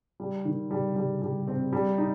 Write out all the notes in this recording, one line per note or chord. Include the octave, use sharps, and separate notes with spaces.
G3
D#3
G3
G3
G3
C4
G3
D#4